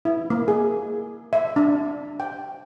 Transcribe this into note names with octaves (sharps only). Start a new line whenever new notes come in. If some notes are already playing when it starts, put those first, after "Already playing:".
E4
A#3
G#4
E5
D4
G5